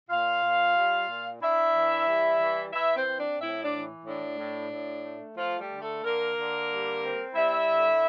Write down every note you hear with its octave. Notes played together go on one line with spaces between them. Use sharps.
A#2 F4 F5
A#2
G3
A#2
D4 E4 E5
E3
G3
E3
E3 E4 E5
C4 C5
C4
D4 D5
A2 E4 E5
D4 D5
E3
A2 D4
A2
A2
A3
F3 A3 F4
G3 G4
D3
A3 A4
D3 A#3 A#4
D3
G3
C4
G3 E4 E5
D3